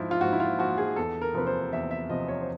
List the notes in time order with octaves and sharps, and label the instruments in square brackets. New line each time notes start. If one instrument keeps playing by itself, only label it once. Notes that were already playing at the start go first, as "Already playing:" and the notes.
Already playing: [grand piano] G#2 F3 E4
F4
G#2 F#4
E4
F4
F3 F#4
G#4
E2 A4
A#4
C3 F3 B4
C5
E2 E5
E5
C3 F3 D#5
C#5
C5